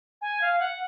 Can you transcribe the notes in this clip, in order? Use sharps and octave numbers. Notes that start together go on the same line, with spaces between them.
G#5
F5
F#5